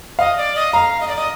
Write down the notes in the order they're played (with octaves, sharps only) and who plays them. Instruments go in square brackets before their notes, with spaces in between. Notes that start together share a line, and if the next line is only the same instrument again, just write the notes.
[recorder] D#5 [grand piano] F5
[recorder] D5
D#5
[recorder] F5 [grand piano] A#5
[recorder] D#5
D5
D#5